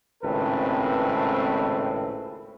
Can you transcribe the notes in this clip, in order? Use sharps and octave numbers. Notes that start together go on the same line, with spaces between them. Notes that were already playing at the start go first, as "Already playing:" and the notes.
G#1 C#2 A2 C4 A4 B4